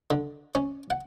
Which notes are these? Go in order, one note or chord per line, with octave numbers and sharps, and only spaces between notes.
D3
C#4
F#5